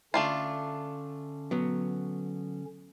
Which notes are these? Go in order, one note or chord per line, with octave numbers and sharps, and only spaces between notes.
D3 A3 C#4 D4 F4
F#3 B3